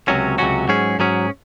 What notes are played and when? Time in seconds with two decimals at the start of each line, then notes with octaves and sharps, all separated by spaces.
0.08 C#2 C3 F#3 C#4 F#4
0.38 C#2 C3 F#3 C#4 F#4
0.68 G#2 F#3 C#4 G#4
0.99 G#2 F#3 C#4 G#4